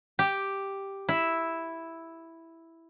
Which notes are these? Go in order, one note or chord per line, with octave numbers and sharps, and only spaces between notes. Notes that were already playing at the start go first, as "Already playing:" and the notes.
G4
E4